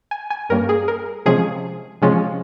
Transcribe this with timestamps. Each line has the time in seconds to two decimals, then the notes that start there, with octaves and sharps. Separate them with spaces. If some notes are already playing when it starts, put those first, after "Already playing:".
0.11 G#5
0.30 G#5
0.49 G2 G3 A#3 C#4 A#4
0.69 G#4
0.88 A#4
1.26 C3 F3 G#3 C#4 G#4
2.02 C3 F3 G#3 C#4